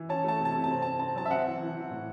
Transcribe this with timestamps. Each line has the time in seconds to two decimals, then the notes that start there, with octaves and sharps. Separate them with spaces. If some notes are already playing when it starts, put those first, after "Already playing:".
Already playing: E3
0.09 C#4 A5
0.24 A3 A5
0.40 C3 A5
0.55 C3
0.64 A5
0.71 C4
0.82 C4 A5
0.99 C4 A5
1.16 F#3 A5
1.26 E5
1.30 C4 F#5
1.46 E3
1.61 E3
1.76 E3
1.90 A2